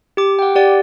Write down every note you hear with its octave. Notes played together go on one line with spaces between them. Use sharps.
G4 D6
F#5 G5
G4 D5 F#5